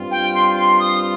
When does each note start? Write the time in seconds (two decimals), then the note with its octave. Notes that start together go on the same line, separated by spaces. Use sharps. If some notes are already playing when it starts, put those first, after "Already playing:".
Already playing: G2 G3 C4 F4
0.11 G5
0.35 C6
0.57 C6
0.80 D#6